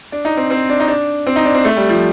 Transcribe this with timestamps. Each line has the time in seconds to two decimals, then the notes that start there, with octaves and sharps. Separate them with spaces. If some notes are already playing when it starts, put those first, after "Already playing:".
0.12 D4
0.25 D#4
0.37 C4
0.51 C4
0.69 D4
0.80 D#4
0.88 D4
1.27 C4
1.36 D#4
1.45 D4
1.55 C4
1.65 A3
1.77 G3
1.89 F3